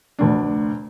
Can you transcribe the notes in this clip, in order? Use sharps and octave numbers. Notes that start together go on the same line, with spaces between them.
F1 D2 D4